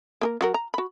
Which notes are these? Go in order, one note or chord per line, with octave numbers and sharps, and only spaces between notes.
A#3 G#4 A#4
F#3 F#4 A#4
A#5
F#4 B5